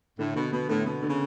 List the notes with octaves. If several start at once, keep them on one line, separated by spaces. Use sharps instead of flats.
A2 D3
B2 D3
B2 B3
A2 D3
B2 B3
D3
C#3